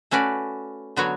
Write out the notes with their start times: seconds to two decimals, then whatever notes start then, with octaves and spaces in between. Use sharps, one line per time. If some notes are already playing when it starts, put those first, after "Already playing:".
0.11 A3 C#4 F#4 B4 D5
0.96 D3 F#3 B3 F#4 C#5